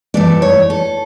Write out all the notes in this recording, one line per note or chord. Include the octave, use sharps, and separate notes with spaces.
G2 E3 A3 D5
C#5
A4